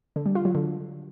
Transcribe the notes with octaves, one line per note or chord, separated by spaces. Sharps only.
D3
G3
F4
F#3
D3